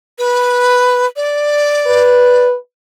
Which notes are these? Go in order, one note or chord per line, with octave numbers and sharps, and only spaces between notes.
B4
D5
B4